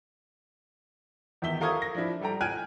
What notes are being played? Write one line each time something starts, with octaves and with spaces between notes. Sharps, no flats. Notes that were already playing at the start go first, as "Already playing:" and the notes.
E2 D#3 E5 G7
A4 A#4 F5 C#6 D#6 G#6
A#6
F3 D4 E4
G3 A4 G5 A#5
G5 G#5 F6 F#6 G#6 D#7